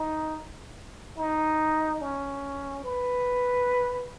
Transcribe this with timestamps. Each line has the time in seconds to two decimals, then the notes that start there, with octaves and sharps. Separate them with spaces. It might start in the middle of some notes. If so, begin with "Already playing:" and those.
Already playing: D#4
1.18 D#4
2.02 C#4
2.84 B4